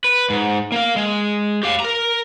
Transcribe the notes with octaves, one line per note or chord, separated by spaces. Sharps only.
B4
G#2
A#3 F5
G#3
G4 F5
A#4 A#5